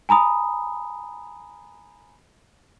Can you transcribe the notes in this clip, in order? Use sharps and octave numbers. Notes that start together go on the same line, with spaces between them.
G#5 A#5 B5 D#6